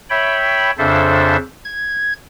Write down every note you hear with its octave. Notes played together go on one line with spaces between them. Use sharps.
C#5 E5 G5 B5
F2 C#3 D4 A4 C5 E5
G#6